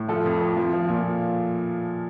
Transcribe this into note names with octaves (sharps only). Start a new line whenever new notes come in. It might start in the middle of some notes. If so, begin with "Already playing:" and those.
Already playing: A2
F3 A4
F2
F2
F3
F3
A#2